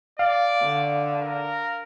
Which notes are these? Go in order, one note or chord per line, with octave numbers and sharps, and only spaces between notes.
D5 F5
D3
A#4